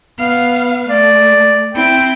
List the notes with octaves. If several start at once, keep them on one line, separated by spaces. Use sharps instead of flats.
B3 F5
A3 D5
C4 E4 G5